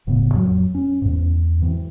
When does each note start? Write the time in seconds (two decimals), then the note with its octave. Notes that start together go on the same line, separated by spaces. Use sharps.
0.07 D#1 A2 C#3 B3
0.34 F2 F#3
0.75 C#4
1.02 E2 G#2
1.61 G#2 E3 C4